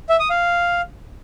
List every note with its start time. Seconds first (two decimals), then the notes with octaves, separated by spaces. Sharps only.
0.09 E5
0.20 D#6
0.30 F5